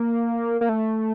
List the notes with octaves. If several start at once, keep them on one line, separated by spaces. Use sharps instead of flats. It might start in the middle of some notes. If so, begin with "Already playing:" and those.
Already playing: A#3
A#3
A3